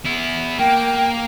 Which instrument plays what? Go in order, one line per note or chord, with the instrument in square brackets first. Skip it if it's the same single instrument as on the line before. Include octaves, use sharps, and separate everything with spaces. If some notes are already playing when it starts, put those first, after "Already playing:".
[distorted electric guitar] B3 E4
[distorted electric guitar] A#3 [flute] G5